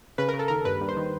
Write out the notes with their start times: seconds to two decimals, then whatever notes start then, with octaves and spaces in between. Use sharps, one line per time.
0.18 C#3 B4
0.28 C#3 A#4
0.39 A4
0.48 D#2 A#4
0.65 G2 B4
0.81 G2
0.89 C5
0.96 D#3